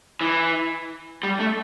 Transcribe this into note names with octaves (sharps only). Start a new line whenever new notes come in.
E3
G3
A3